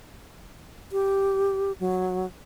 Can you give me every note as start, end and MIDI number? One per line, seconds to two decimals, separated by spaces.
0.92 1.72 67
1.80 2.26 54